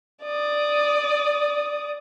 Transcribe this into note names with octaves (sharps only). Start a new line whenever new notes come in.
D5 D#6